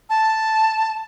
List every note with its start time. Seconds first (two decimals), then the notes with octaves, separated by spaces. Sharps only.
0.10 A5